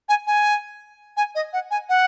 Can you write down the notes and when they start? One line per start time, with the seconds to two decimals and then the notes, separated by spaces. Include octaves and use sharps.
0.09 G#5
0.27 G#5
1.17 G#5
1.35 D#5
1.53 F#5
1.71 G#5
1.89 F#5